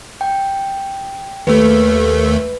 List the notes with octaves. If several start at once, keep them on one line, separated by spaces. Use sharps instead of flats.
G5
D#2 A3 B4